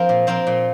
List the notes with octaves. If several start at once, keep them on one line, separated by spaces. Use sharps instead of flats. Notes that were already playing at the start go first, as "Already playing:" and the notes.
Already playing: F3 C4 F4 A#4
A#2
F3 C4 F4 A#4
A#2